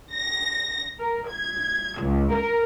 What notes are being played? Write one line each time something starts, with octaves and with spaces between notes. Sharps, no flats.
A#6
A#4
G#6
C#2
A#4